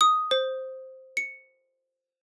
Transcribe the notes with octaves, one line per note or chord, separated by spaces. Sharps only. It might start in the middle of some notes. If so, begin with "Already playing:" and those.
D#6
C5
C#7